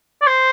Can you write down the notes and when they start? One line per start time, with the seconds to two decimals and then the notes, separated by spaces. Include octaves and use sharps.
0.22 D5
0.27 C5